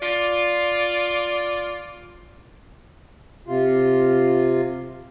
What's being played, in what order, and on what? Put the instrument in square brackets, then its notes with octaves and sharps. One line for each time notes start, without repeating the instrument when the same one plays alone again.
[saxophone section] F4 D5
[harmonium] C3 F4